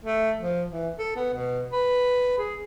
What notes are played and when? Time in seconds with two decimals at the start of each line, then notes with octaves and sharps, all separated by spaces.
0.05 A3
0.40 F3
0.71 E3
0.99 A4
1.16 B3
1.33 B2
1.72 B4
2.38 G#4